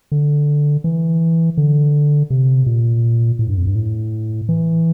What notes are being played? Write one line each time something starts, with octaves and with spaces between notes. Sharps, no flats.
D3
E3
D3
C3
A#2
A2
G2
F2
G2
A2
E3